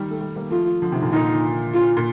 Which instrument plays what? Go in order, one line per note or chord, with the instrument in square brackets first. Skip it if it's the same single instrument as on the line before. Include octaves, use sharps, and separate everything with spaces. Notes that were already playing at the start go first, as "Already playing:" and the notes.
Already playing: [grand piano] D#3 G3
A3
D#3 G3
G3 A#3
[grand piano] F3 A3 [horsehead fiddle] F4
[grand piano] D3 F3
C3 D#3
A#2 D3
[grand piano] A#2 D3 [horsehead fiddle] D#4
[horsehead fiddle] F4
[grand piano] A#2